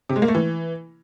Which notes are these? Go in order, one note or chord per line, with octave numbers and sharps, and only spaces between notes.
C3
G#3
A#3
A3
E3